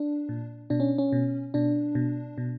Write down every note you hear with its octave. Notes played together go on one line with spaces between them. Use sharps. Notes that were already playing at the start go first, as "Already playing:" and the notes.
Already playing: D4
A#2
B2 D4
C#4
C#4
B2
B2 D4
B2
B2